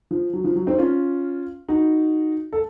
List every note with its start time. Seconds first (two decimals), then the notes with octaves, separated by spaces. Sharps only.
0.11 F3
0.33 F#3
0.44 F3
0.56 F#3
0.66 C4 D#4
0.78 C#4 F4
1.68 D#4 F#4
2.53 A4